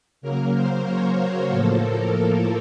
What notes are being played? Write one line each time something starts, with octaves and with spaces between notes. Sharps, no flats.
C#3 F#3 A#3 A#4
C5
C#5
F#4
A2 F3 A#3 A4
A#4
A4